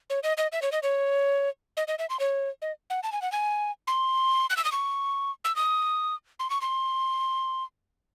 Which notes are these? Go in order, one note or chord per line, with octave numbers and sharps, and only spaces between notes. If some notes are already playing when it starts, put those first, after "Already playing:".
C#5
D#5
D#5
E5
C#5
D#5
C#5
D#5
D#5
E5
C6
C#5
D#5
F#5
A5
G#5
F#5
G#5
C6
F#6
E6
D#6
C#6
E6
D#6
C6
C#6
C6